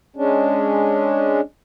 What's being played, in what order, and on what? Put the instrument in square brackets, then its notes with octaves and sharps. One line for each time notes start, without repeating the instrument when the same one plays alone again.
[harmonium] G#3 C#4 D4